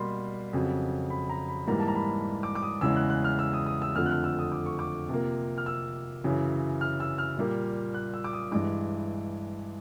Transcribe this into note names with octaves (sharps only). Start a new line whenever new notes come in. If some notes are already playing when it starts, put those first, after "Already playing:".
Already playing: B2 G3 A#3 B5 C6
F2 C#3 F#3
B5
A#5
B5
G#2 E3 G3 A#3 A#5
A5
A#5
B5
D6
D6
D#6
E2 C#3 E3 G#3 E6
F#6
F#6
F6
E6
D#6
D#6
E6
F2 D3 F3 A3 F6
F#6
F6
E6
D#6
D6
C#6
D6
C3 F3 A#3
F6
E6
F#2 C#3 E3
F6
E6
F6
A#2 G3 A#3
F#6
E6
D6
D#6
G2 E3 G#3 D6